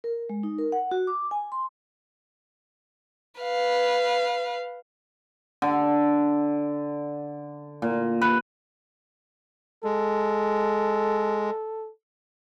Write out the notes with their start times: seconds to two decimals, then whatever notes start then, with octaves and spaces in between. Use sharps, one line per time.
0.04 A#4
0.30 G#3
0.43 D#4
0.59 A#4
0.72 F#5
0.91 F#4
1.07 D6
1.31 G#5
1.52 C6
3.41 B4 F5
5.62 D3
7.82 A#2
8.21 B4
9.84 G#3 A4